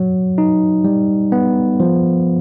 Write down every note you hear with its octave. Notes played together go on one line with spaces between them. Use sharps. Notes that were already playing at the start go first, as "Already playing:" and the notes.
Already playing: F#3
D#4
G3
B3
F3